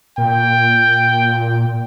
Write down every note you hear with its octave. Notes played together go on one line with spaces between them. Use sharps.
A#2 G5